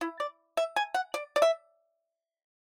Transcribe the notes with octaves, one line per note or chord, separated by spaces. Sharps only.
E4
D5
E5
G#5
F#5
D5
D5
E5